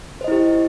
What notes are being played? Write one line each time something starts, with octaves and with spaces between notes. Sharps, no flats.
E4 G4 C5 D#5